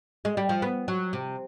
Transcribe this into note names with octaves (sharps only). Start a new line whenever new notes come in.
G#3
G3
F3
B3
F#3
C3